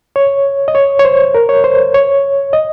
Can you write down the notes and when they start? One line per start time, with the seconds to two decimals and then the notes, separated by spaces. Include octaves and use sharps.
0.16 C#5
0.68 D#5
0.75 C#5
0.99 C#5
1.05 C5
1.35 A#4
1.49 C#5
1.64 C5
1.94 C#5
2.53 D#5